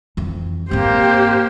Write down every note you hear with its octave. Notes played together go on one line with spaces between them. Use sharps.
F2 E3
G#2 A#3 C4 G4 C5